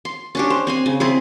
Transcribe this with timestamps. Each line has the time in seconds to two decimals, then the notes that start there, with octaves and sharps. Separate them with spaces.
0.05 C6
0.35 C#4 D4 G4
0.50 C5
0.67 C4 C5 G#5
0.86 C#3
1.00 C4 E4 G#4